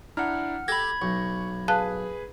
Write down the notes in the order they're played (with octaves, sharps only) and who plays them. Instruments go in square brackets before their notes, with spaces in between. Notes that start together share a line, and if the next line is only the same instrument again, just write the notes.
[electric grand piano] D4 E4 A#5 [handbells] F#5 F6
[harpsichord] G4 A4 [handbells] B5 G#6 [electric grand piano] A#6
[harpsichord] B1 [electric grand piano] C#6
[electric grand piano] G#4 B4 [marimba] F5 A5 F#6